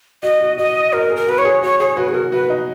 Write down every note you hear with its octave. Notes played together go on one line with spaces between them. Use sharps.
F#4 D#5
F#4
F#4 D#5
F#4 A#4
G#4
A#4
F#4 B4
C#5
G#4
F#4 C#5
G#4 C#5
F#4 B4
G#4
F#4 A#4
F#4 B4
D#4